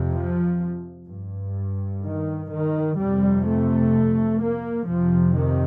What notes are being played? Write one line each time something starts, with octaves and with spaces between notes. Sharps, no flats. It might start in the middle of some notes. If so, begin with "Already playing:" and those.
Already playing: F2 C3
F3
G2
D#3
D#3
F2 C3 G3
A3
A#3
F2 C3 F3
D#3